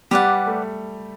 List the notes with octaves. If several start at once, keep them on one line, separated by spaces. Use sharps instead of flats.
G3 G4 B4 D5 F#5
A3